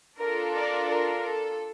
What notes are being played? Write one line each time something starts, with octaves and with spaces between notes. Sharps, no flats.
D4 F4 A4 A#4
A#4 D5
A#4
A4